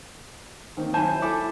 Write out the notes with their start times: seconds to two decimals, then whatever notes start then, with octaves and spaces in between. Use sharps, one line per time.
0.77 D#3 A#3 C4
0.94 F#3 E4 C5 G#5 A5
1.22 E4 A4 D6